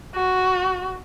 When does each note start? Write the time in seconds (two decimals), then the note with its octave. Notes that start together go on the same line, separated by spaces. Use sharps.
0.15 F#4